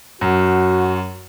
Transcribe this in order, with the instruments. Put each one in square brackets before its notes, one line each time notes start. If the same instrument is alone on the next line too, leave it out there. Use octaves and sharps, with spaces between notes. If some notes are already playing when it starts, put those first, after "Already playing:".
[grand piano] F#2 [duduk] F#4